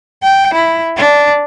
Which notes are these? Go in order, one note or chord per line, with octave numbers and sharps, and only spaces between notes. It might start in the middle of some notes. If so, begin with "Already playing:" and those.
G5
E4
D4